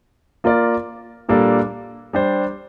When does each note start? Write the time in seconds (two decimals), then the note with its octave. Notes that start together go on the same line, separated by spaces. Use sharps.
0.44 A#3 F4 A#4 D5
1.29 A#2 G3 A#3 D4 A4
2.13 G3 D4 G4 C5